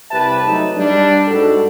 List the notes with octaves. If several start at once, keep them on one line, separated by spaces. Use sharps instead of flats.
C2 G4 B4 E5 A5
F#3 A3 D#4
G3 D4
G#2 G3 F#4 A4